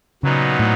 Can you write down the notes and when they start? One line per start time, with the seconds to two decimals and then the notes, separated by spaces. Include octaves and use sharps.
0.23 A#2 C#3 F#3 B3 D#4
0.59 A2